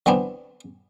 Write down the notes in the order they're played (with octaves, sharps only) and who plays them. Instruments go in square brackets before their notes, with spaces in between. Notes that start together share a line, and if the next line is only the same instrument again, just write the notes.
[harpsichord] D3 E3 B3 C4 D4